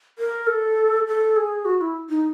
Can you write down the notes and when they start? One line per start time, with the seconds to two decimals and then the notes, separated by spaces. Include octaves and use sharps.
0.19 A#4
0.47 A4
1.07 A4
1.36 G#4
1.65 F#4
1.81 E4
2.09 D#4